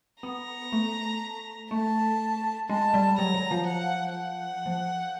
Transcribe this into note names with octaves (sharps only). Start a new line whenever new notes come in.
B3 A#5
A3
A3 A5
G#3 A5
G3
F#3 A#5
F#3
F3
F#5
F#5
F3